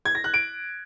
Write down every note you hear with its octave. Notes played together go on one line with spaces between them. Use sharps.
G#6
A#6
F#6
D7